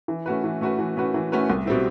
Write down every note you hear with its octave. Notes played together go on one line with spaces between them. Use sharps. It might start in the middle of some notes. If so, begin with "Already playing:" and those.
E3
A3 C#4 F#4 B4
E3
A3 C#4 F#4 B4
E3
A3 C#4 F#4 B4
E3
A3 C#4 F#4 B4
C2
B2 G3 C4 E4